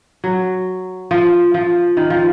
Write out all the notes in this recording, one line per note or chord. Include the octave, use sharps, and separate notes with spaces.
F#3
F3
F3
D#3
F3